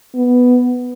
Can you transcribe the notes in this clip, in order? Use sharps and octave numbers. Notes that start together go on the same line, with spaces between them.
B3